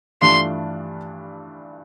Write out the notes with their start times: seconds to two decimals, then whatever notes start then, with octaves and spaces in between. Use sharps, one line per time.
0.21 G2 E3 A3 D4 F4 C6